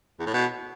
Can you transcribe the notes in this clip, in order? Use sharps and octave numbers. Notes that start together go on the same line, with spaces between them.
E2
A2
B2